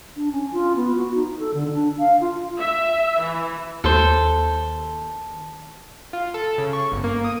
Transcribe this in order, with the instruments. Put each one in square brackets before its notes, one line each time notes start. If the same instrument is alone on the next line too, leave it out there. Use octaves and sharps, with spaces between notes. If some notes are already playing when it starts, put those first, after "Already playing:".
[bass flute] D4
C#4
F4
B3
F#4
D#4
A4
D3
D4
F5
F4
[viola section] E5
E3
[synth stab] D#2 [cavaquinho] A4 C5
[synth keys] F4
A4
C#3
C#6
G1
A#3
D#6